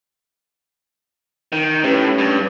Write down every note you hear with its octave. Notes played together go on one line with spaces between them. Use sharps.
D#3
A2 C#4 G4 B4
G2